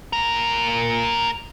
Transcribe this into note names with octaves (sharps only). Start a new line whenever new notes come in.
A#2 A#4